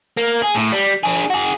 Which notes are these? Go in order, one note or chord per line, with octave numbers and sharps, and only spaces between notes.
A#3
G#4
A2
G3
D4 G#4
F#4 G#4